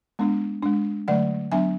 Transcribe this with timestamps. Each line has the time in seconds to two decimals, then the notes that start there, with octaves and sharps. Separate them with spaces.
0.19 G#3 B3 D4
0.63 G#3 D4
1.08 D3 F#3 A3 D5 F#5
1.52 F#3 B3 D4 E5 G#5